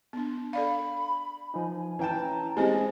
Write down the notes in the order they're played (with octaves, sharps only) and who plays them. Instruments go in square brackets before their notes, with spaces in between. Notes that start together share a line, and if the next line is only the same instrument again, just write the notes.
[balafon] B3 D4
[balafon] A4 D5 F5 [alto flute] B5
[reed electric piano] F3 D#4 [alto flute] G#5
[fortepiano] E3 G5 A5 [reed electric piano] C#4 E4 [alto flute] A#5
[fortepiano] G#3 [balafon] C4 G4 C5 [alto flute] D#5